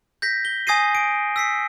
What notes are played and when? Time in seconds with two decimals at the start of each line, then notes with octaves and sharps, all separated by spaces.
0.22 G6 A#6 B6
0.45 G7
0.67 G#5 D#6 G#6 A#6 C7 D#7
0.95 C7 D7
1.36 E6 B6 C7